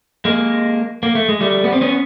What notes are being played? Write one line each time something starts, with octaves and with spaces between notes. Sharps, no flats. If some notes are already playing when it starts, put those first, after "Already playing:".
G#3 A#3
A#3
A3
G#3
G3 A3
B3
C4
B3 C#4